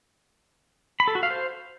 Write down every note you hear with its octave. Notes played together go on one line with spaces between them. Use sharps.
B5
A4
F#4
F5
C5